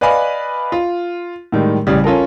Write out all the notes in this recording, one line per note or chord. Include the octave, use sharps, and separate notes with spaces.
B4 D5 D#5 F5 G#5 B5
F4
A2 D#3 G3 G#3
A1 C#3 G3
C#4 F4 A4 A#4